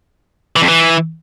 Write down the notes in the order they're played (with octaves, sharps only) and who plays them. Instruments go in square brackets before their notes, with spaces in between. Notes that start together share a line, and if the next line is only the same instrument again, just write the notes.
[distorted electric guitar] E3
F2
E3